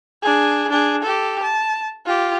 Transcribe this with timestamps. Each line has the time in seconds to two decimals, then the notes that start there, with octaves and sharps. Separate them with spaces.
0.23 D4 G#4
0.70 D4 G#4
1.02 G4 A4
1.43 A5
2.06 F4 G4